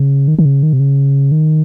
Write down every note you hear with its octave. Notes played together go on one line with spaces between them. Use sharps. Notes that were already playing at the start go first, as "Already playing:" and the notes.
Already playing: C#3
D#3
D#3
C#3
D#3
C3
C#3
D#3